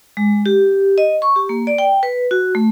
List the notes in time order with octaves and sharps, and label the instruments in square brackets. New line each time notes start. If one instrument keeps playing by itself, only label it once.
[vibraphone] G#3
G4
D#5
C#6
G4
A#3
D5
G5
B4
F#4
A3